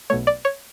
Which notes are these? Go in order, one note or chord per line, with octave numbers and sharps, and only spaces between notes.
B1 B2 A3 C#5
D5
C#5